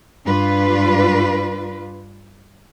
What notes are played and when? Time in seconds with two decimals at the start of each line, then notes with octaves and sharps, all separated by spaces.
0.24 G2 D4 F4 B4